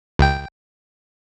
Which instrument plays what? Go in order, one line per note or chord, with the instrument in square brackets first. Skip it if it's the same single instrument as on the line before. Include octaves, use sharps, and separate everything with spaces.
[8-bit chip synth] C#2 G5